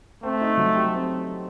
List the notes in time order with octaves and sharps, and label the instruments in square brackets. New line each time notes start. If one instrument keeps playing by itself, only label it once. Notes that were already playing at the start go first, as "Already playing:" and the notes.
[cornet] A3 [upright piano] C4
[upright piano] D#4
F#3
G4
C4